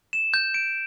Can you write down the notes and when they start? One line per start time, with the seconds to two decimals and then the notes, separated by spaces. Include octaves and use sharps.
0.13 E7
0.34 G6
0.54 D7